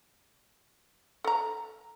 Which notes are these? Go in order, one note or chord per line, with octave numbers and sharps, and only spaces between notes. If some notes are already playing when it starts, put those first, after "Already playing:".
A4 A#5